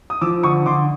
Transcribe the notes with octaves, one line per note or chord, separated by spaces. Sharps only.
D#6
F3 D6 E6
D3 C#6 D#6
D3 C6 D6